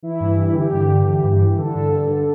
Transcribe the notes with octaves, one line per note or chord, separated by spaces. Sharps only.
E3 E4
G2
E3
E4
D3 G4
G2
D3
E3
G2
E3
D3 A4
G2
D3
D3